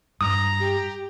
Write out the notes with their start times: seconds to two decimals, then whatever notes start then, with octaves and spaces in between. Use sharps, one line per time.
0.21 G2 A#5 D#6
0.60 G4